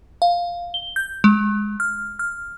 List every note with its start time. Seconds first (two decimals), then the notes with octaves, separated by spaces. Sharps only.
0.22 F5
0.74 G7
0.96 G6
1.24 G#3
1.80 F6
2.19 F6